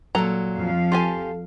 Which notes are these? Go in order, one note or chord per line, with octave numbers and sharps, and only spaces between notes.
A#2 F#3 A4 A#5
F2 F3 F5
F4 G4 A4 G#5